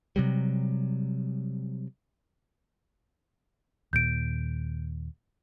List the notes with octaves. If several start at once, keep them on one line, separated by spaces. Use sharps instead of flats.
C3 F#3 G3
D#2 A#2 G6 D7